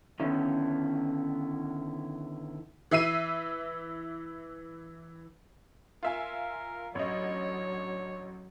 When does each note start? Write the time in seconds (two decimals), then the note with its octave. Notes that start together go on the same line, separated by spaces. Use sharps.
0.20 D3 D#3 B3 C#4 E4
2.91 E3 E5 C7 D#7
6.03 F4 A#4 E5 G#5
6.95 A1 F#3 D4 C#5 D#5